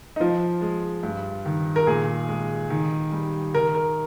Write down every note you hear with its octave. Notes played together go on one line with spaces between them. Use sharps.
D#4
F3 F4
G#3
G2
D#3
A#4
A#2 G#4
G#3
D#3
G3
D#3 A#4
A#4